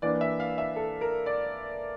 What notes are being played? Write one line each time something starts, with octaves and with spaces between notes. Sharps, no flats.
E3 A#3 D4 D5
E5
F5
E5
A4
A#4
D5